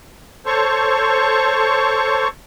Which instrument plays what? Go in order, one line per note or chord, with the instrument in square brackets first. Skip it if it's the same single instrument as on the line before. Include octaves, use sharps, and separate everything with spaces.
[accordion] A4 C5 C#5 C#6